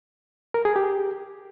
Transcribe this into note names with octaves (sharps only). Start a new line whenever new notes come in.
A#4
G#4
G4